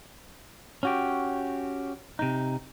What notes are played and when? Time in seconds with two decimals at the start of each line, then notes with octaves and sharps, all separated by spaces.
0.83 C#4 F#4 G4
2.19 C3 D#4